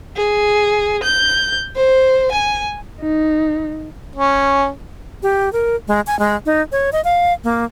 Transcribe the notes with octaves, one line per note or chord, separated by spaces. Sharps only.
G#4
G6
C5
G#5
D#4
C#4
G4
A#4
G#3
G#5
G#3
D#4
C#5
D#5
F5
A#3